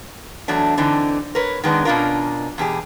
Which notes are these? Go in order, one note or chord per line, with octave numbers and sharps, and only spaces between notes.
E2 F#3 A3 D4
D3 E3 C4 D4 D#4
A#4 B4 C#5
D#3 G#3 B3 D4
B2 C#4 D4 F4 A#4
E2 B2 G4 G#4